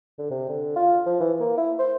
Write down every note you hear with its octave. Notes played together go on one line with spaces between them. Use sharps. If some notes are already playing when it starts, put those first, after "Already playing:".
D3
C3
D3
F4
F3
E3
A#3
E4
C5